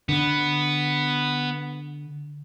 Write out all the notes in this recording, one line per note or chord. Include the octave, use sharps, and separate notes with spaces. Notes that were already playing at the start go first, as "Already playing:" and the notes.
D3 B3